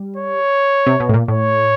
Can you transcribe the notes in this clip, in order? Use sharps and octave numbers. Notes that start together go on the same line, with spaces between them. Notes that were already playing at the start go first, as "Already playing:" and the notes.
Already playing: G3
C#5
C3
B2
A2
A#2
A2 C#5